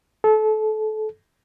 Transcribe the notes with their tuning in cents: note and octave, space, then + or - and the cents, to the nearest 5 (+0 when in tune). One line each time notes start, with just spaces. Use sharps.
A4 -25